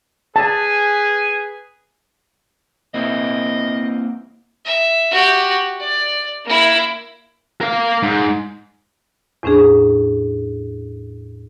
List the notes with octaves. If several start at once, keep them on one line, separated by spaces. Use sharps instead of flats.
G#4 B4 G#5 A5
A#3 C4 E4 D#5
E5
F#4 G4
D5
A#3 E4
A#4 F5
G#2
E2 A2 C#4 D4 G#4